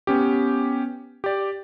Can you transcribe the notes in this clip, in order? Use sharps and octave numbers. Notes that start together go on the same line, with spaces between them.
B3 C#4 G4
G4 D5